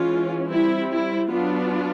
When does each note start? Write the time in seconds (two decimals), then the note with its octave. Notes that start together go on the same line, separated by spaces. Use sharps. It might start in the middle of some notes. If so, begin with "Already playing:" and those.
Already playing: E3 G#3 C#4 F4
0.51 G3 C4 E4
0.91 E4
1.30 F#3 B3 D4 F4